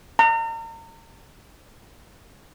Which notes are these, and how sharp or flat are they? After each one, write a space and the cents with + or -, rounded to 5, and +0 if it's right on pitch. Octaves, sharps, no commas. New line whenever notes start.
A#5 -40